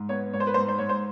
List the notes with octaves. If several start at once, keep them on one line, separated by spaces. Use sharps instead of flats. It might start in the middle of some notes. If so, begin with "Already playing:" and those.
Already playing: G#2
B3 C#5
G#2 C#5
C5
B4
G#2 C5
C5
G#2 C#5
C5